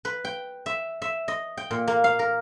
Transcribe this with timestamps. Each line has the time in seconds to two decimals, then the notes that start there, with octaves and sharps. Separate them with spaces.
0.05 B4
0.25 G5
0.66 E5
1.02 E5
1.28 D#5
1.57 G5
1.71 A#2
1.88 A#3
2.04 F5
2.19 A#4